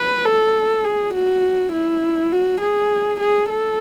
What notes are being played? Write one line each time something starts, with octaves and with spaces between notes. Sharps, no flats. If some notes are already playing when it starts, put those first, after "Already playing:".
Already playing: B4
A4
G#4
F#4
E4
F#4
G#4
G#4
A4